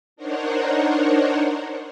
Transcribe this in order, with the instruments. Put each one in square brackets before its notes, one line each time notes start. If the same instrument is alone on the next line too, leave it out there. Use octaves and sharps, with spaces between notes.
[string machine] D4 D#4 A#4 C5 C#5 F#5